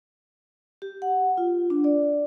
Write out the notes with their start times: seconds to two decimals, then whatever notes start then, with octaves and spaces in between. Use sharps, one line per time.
0.82 G4
1.02 F#5
1.37 F4
1.70 D4
1.84 D5